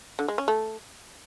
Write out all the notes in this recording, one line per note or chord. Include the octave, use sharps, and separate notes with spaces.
D3
G#3
C#4
A3